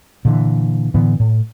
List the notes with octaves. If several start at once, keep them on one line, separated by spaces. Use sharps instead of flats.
A#2 D3 E3
A2 D3 E3 B3
A2